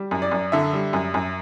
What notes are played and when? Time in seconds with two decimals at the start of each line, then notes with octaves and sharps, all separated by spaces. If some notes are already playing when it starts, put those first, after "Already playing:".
Already playing: G3
0.11 F#2
0.22 D5
0.32 F#2
0.52 D3 E5
0.73 G3
0.93 F#2
1.14 F#2